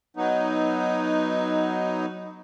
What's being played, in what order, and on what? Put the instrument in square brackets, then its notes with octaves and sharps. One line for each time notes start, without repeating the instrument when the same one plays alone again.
[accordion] F#3 B3 D#4